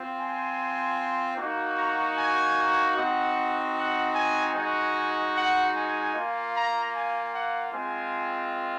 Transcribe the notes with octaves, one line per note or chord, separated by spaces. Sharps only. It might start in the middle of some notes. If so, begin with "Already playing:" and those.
Already playing: C4 F4
G#5
A#3 D#4 F#4
A#5
G#5
C4 D#4 F#4 F#5
F#5
G#5
G#3 D#4 F#4 G#5
F#5
G#5
A#3 F4
A#5
G#5
F#5
G#3 C4 F4 G#5